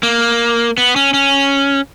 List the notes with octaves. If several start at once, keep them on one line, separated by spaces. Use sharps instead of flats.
A#3
B3
C#4
C#4